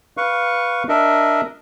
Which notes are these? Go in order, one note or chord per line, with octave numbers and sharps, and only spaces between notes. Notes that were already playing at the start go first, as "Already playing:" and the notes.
B4 F5 C#6
D4 A#4 D#5 E5